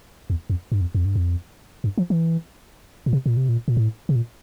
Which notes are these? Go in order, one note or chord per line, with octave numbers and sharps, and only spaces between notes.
E2
F2
G2
F2
F2
G2
F2
G2
F3
E3
A#2
C3
A#2
C3
A#2
A#2
A2
C3
A#2